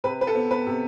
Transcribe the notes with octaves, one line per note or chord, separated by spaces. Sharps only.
C3 B4
B4
A4
B3
B4
C3